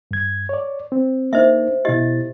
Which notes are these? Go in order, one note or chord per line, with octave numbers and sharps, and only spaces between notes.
G2 G#6
C#5 D5
C4
A#3 D4 D#4 C5 D#5 E5
B2 E4 G4 D#5 A6